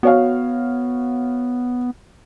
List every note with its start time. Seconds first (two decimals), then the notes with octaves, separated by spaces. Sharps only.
0.03 B3 F#4 C#5 F5